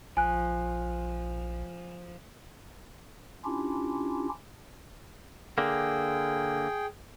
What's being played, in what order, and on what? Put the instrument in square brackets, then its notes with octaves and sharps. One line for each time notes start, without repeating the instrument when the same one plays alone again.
[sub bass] A#1 [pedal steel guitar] F3 [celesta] G#5 F#6
[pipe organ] C#4 D4 E4 F4 G4
[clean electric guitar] D3 A#3 [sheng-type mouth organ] G#4 G5